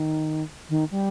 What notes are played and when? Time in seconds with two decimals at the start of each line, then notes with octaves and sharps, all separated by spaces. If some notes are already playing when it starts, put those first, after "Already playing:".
Already playing: D#3
0.69 D#3
0.91 G3